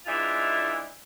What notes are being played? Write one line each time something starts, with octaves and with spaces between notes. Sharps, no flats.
G#2 E3 G#3 D4 E4 F4